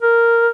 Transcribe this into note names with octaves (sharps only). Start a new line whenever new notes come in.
A#4